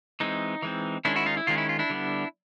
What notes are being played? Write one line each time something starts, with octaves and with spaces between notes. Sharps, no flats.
E3 G#3 C4 D#4
E3 G#3 C4
D#3 G#3 C#4 D4 E4
E4 F#4
D#4 F4
E4
D#3 G#3 C#4 F4
E4
F4
D4 E4
D3 G3 B3